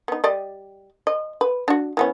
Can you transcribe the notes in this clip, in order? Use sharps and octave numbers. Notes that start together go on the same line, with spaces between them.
B3 D#4
G3 D5 D#5
D#5
B4
D4 F#4
E3 B3 C#4